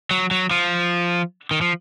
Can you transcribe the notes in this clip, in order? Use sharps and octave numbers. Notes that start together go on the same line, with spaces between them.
F#3
F#3
F3
D#3
F3